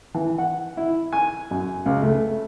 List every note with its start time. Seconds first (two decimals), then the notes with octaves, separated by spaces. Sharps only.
0.15 E3
0.38 F#5
0.77 E4
1.12 G#5
1.51 F#2
1.86 C#2
2.02 A3